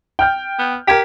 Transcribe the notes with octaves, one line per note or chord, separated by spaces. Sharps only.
G5 F6 G6
B3
G4 A#4 G#6 B6